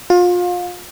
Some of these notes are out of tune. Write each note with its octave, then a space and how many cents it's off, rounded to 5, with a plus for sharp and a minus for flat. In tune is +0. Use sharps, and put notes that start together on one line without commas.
F4 +30